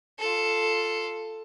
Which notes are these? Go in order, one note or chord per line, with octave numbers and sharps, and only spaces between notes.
F4 A4